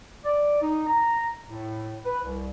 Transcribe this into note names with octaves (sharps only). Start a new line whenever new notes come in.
D5
D#4
A#5
A2
B4
C2